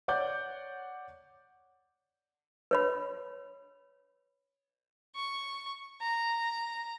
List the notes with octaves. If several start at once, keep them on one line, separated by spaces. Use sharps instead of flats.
C#5 D5 F#5 D6 G6
B4 C#5 B5
C#6
A#5